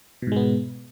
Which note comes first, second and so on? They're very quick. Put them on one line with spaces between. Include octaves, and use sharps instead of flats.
B2 G#2 G#3 B3